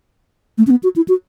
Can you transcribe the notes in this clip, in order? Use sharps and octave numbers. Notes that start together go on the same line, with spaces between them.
A3
C#4
B3
F#4
E4
F#4